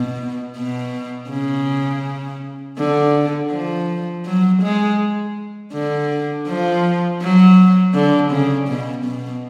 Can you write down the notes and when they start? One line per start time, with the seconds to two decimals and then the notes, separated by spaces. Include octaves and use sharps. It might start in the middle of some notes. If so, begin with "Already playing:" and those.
Already playing: B2
0.57 B2
1.30 C#3
2.78 D3
3.51 F3
4.26 F#3
4.62 G#3
5.73 D3
6.47 F3
7.21 F#3
7.94 D3
8.31 C#3
8.68 B2
9.05 B2